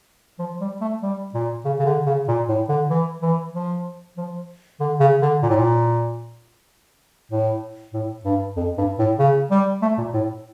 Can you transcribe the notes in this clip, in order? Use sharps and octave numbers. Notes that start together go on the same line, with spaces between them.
F3
G3
A3
G3
A#2
C#3
C#3
D3
C#3
A#2
A2
D3
E3
E3
F3
F3
D3
C#3
D3
A#2
A2
A#2
A2
A2
G2
F2
G2
A2
C#3
G3
A3
A#2
A2